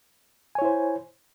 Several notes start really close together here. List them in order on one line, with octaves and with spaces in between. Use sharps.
G#5 C#5 E4 C5